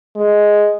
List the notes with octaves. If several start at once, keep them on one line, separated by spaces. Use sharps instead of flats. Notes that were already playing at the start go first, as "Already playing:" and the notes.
G#3